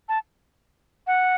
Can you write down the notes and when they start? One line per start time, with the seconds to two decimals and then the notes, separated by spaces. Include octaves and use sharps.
0.09 A5
1.07 F#5